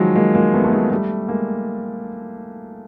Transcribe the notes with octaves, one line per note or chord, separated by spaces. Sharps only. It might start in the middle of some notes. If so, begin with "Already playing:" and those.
Already playing: D#3 F3 F#3 G#3
G#3 A#3
G#3 A#3
A3 B3
A3
G#3 A#3
G3 A3
G#3 A#3